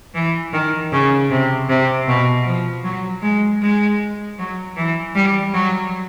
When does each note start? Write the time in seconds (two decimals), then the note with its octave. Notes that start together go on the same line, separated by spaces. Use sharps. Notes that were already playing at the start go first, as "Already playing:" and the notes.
0.14 E3
0.53 D#3
0.92 C#3
1.30 C3
1.69 C3
2.08 B2
2.46 F3
2.84 F#3
3.22 G#3
3.62 G#3
4.39 F#3
4.76 E3
5.15 G3
5.54 F#3